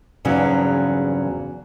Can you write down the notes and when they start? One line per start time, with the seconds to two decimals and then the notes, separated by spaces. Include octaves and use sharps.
0.25 E2 G2 C#3 F#3 C4 D#4